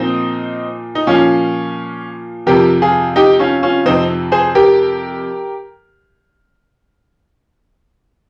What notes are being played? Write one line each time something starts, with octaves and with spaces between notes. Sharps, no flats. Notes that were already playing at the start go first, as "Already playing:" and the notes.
Already playing: A#2 F3 C4 D#4
D#4
A#2 F3 C#4 F4
F2 C3 F3 G4 A#4
F4 G#4
D#4 G4
C#4 F4
C#4 F4
F2 C3 F3 C4 D#4
G#4 C5
G4 A#4